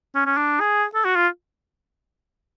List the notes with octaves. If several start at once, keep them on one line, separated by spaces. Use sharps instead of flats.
C#4
C#4
D4
G#4
A4
F#4
F4